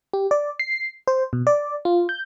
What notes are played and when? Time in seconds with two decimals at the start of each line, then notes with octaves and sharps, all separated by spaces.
0.14 G4
0.31 D5
0.60 C7
1.08 C5
1.33 B2
1.47 D5
1.85 F4
2.09 G6